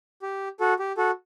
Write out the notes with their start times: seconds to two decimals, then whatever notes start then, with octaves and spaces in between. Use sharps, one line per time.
0.22 G4
0.60 F#4 A4
0.79 G4
0.97 F#4 A4